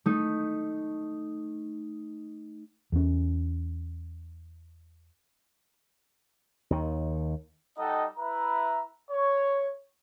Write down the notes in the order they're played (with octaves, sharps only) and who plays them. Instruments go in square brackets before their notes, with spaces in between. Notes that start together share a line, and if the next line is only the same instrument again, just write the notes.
[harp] A3 D#4
[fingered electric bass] E2 C#4
[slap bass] D#2 D#3
[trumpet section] G3 D#4 A4 D#5 F#5 G5
E4 B4 E5 A#5
C#5